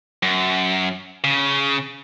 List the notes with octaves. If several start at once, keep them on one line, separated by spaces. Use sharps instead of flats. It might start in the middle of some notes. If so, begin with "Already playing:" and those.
F#2
C#3